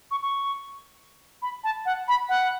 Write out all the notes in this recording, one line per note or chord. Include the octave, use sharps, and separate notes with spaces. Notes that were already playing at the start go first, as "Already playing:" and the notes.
C#6
C#6
B5
A5
F#5
B5
F#5